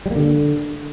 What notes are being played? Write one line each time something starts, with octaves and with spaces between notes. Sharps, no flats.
G3
A#3
D3